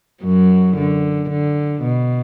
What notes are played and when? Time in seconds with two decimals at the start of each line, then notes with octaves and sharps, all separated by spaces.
0.23 F#2 F#3
0.77 D3
1.30 D3
1.82 B2